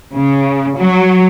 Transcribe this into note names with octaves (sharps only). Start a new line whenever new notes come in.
C#3
F#3